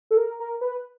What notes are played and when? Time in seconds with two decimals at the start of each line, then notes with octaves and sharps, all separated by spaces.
0.11 A4
0.17 A#4
0.40 A#4
0.61 B4